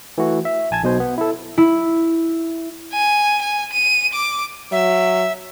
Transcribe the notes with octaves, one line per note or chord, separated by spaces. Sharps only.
E3 A3 F#4
E5
A#1 G#5 A5 G#6
B1 B2 C5
B3
E4 A4
E4
G#5
G#5
D#7
D6
F#3 E5